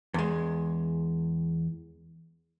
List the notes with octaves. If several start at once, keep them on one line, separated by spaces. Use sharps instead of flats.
E2 G#3